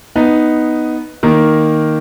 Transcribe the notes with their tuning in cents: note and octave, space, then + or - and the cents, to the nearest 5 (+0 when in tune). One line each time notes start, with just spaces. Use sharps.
B3 +0 D#4 +0
D#3 +0 A#3 +0